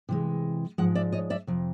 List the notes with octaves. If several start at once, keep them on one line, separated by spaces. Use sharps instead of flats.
C3 E3 G#3
G#2 F3 G#3 F#5
D5 E5
C#5 D#5
D5 E5
F2 C3